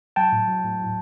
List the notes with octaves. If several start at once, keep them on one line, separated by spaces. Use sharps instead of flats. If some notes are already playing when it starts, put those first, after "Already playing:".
F#3 G5 A5
A2
F#3
A2
F#3